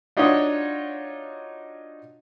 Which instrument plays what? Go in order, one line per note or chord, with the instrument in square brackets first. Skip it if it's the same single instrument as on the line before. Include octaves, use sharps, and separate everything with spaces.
[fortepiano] D4 D#4 F4 F#4 C#5 D#5